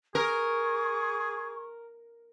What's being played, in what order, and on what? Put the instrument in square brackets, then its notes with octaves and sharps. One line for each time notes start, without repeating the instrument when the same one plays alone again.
[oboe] G#4 [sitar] A#4 [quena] C#6